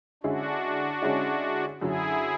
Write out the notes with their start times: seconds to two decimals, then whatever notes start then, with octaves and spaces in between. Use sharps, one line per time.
0.23 D3 G#3 C#4 D4 E4 F#4 G#4
1.02 D3 G#3 C#4 E4 G#4
1.81 F#2 D3 F#3 E4 G#4